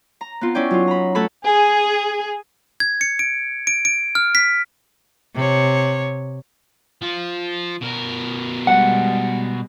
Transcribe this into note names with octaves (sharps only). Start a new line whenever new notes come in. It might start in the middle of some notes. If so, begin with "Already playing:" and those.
A#5
B3 C4 F4
C#4 E4 D5 G5
F#3 D#4 F4
A#5 B5
A3 F#4 A4 C#5 B5
G#4
G#6
C#7
D7
D7
D7
F6
B6
C3 C#5
F3 F4
B2 A#4
G3 G#3 F#5